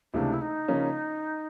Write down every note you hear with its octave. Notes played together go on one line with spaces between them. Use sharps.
C#2 C3 E3 A3 D4
E4
D#4
C#3 F3 A#3 C#4